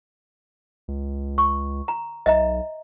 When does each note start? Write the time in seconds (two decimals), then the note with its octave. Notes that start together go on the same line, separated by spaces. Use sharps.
0.88 C#2
1.38 C#6
1.88 A#5
2.26 B1 D#5 E5 A#5